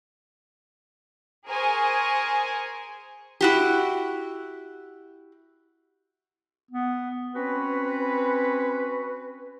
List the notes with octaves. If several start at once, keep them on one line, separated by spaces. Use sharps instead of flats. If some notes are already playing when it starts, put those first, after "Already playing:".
G#4 A#4 C5 G#5 C#6
E4 F#4 G4
B3
C4 C#4 F#4 B4